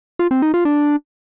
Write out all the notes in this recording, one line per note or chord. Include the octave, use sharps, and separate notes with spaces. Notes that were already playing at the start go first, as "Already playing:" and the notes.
F4
C4
D#4
F4
D4